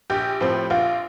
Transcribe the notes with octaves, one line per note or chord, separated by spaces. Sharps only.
A#1 G4
A2 F3 C4
A#1 F4